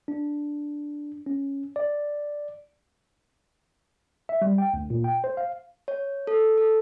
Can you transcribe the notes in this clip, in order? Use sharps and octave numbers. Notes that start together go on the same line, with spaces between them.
D4
C#4
D5
E5
G3
G5
D2
A#2
G5
C5
F5
C#5
A4
A4